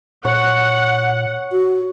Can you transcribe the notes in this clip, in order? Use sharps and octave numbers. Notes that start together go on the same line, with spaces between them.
A#2 C#5 F#5
F#4